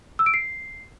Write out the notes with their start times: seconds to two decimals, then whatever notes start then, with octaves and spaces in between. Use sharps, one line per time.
0.19 E6
0.26 D7
0.34 C7